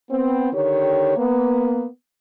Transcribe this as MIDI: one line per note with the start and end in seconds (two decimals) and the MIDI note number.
0.10 0.52 59
0.10 0.52 60
0.53 1.15 50
0.53 1.15 51
0.53 1.15 67
0.53 1.15 73
1.17 1.86 58
1.17 1.86 59